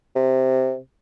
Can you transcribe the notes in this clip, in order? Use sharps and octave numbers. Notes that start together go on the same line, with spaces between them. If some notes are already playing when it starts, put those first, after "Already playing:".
C3